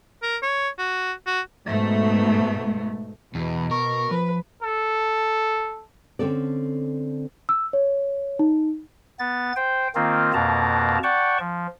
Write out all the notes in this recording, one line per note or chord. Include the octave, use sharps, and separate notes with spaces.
A#4
C#5
F#4
F#4
G#2 B2 A3
E2 B2
A#4 C#6
F3 B4
A4
D3 C4 C#4 A4 D5
E6
C#5
D#4
B3 A6
C5 G5
D#3 A#3 C4 F4
F2 B2 A#3 A5 A#5
D5 F#5 G5 A5 C#6
F3